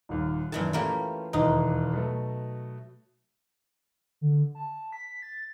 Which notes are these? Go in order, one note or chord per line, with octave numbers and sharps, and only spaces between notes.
D#1 D#2
F#2 A#2 D#3 E3 A5
E3 A3 A#3 C#4 F4 G4
E1 D#2 E3 D#4
B2 F#3 A3
D3
A5
B6
A6